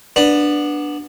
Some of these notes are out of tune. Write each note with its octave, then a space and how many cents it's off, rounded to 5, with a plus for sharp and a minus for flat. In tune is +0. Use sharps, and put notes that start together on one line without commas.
B3 -10 D4 +5